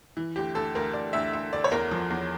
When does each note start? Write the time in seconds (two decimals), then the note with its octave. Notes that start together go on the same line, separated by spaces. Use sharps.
0.17 E3
0.36 D2 G4
0.55 D2 A4
0.75 D2 A#4
0.94 D2 D5
1.13 D2 E5
1.33 D2 E5
1.53 D2 D5
1.64 C#5
1.71 E2 A#4
1.91 F3
2.10 E2